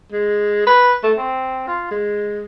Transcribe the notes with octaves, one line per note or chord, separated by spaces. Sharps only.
G#3
B4
A3
C4
F4
G#3